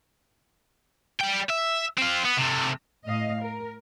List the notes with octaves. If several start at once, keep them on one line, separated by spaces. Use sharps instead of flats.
G3 G5
E5
C4 F4
B3
C3 A3
A2 D#5 F5
A#4